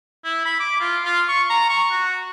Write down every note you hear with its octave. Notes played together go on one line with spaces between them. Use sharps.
E4
B5
D6
F4
F4
C#6
A#5
C#6
F#4